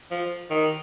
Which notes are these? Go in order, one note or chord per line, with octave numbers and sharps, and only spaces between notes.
F3
D#3